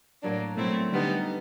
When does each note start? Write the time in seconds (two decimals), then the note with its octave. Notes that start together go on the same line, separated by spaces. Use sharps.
0.22 A2 F#3 A#3 D4
0.56 B2 F#3 A3 C4 E4
0.91 D3 G3 B3 D#4